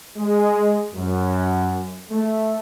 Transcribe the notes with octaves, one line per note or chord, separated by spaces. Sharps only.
G#3
F#2
A3